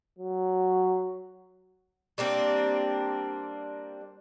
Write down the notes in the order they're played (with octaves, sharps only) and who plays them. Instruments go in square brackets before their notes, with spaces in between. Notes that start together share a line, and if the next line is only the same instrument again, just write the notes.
[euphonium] F#3
[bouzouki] G3 A#3 C4 D4